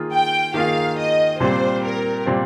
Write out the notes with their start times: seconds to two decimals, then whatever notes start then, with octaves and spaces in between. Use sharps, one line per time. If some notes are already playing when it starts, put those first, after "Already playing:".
Already playing: D#3 A#3 F4 G#4
0.12 G5
0.54 D#3 A#3 F4 G#4 F5
0.98 D#5
1.40 A#2 G3 C4 C5
1.83 A#4
2.26 A#2 G3 C4